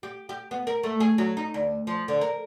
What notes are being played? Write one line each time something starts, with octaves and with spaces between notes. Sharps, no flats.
G4
G4
B3
A#4
A3
G#4
F#3
D#4
D2
F3
D3
A#4